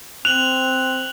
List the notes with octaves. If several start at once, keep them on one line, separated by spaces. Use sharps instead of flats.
C4 F#6 F7 F#7